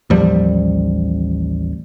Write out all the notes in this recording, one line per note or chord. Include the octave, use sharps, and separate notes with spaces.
A1 D#2 F3 G3